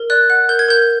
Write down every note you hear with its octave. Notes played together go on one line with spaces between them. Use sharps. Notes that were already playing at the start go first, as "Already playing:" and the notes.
Already playing: A#4
D5 F#6
F#5 F#6
A#4 G6
G#6
A#4 G6